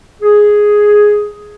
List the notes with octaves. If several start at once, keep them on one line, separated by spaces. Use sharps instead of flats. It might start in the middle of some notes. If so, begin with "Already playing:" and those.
G#4